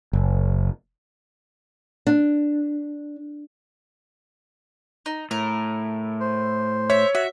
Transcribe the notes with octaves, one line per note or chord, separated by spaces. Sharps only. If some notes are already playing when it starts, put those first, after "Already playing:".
F#1
D4
D#4
A2 A#4
C5
C#5 E5
F#4 E5